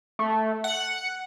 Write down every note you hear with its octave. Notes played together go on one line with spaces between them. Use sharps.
A3
F#5